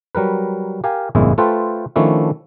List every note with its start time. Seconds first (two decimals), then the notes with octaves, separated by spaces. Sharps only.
0.15 F#3 G3 A#4 B4
0.84 G4 A#4 F5 G#5
1.15 G1 F2 A#2 G#3 E4
1.38 A3 F4 A4 B4 C5 G5
1.96 D#3 F3 A3 C#4 D4 E4